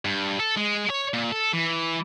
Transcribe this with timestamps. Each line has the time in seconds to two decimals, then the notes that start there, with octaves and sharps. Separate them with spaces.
0.05 G2
0.40 A4
0.57 G#3
0.90 C#5
1.14 A#2
1.32 A4
1.53 E3